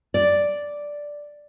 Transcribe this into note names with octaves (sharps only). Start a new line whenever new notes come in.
D5